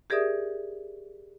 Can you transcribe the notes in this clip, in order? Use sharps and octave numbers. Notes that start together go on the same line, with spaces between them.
G4 G#4 A#4 D5 E5 D#6